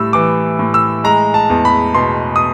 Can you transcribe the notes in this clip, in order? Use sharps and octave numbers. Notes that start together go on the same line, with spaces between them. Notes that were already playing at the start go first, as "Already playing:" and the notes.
Already playing: A2 G3 E6
E3 D6
A2
E6
G#3 A#5
A5
E2
B5
B2 C6
D#6